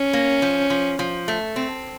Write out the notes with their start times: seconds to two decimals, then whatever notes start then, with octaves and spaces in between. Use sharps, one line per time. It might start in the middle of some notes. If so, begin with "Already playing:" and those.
Already playing: C#4
0.13 A#3
0.42 F3
0.70 F3
0.99 F3
1.28 A3
1.56 C4